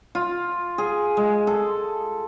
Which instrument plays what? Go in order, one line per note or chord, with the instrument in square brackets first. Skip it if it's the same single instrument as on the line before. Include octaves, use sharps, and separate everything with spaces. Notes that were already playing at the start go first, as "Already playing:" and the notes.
[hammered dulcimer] F4
G#4
G#3
A4